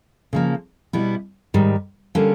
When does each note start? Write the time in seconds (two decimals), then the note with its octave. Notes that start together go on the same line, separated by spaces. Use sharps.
0.33 C#3 F3 A#3
0.93 B2 G3 B3 E4
1.54 G#2 D#3 G3
2.15 D3 G3 A#3 C#4